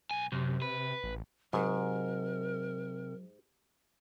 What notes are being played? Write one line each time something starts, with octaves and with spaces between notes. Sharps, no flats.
B1 G#5
F#2 C3
B4
A1
G#2 C3 F#3 A#4